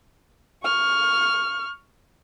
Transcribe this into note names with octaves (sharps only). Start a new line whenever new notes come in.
C#6 F6